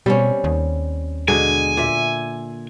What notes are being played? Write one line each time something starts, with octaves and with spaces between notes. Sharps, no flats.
B2 G3 C4 C#4
D#2
B2 D3 G#3 G#5
A#2 E5